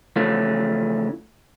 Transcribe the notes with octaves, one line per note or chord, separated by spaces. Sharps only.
C#3 E3 F3 A3 C#4